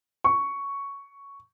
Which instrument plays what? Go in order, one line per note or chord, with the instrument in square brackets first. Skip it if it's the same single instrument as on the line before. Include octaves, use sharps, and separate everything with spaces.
[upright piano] C#6